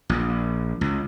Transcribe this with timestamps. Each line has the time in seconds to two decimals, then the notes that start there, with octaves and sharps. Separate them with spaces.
0.09 A#1
0.81 C#2